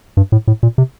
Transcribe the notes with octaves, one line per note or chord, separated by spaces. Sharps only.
G2
A2
A2
A#2
C3